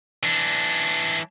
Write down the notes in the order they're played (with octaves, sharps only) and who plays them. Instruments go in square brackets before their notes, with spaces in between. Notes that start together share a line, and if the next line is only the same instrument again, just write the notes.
[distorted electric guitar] E3 D4